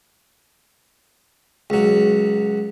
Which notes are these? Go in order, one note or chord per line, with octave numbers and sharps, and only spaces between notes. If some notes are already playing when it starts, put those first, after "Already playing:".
C#2 F#3